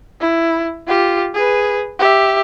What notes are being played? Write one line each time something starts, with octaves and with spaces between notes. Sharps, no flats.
E4
F4 G4
G#4 B4
G4 E5